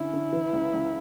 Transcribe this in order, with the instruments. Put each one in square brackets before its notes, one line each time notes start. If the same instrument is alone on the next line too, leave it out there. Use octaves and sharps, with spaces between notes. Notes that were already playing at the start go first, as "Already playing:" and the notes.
Already playing: [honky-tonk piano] D3 C#4 [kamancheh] E4
[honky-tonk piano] D3
E3
C#2
C#2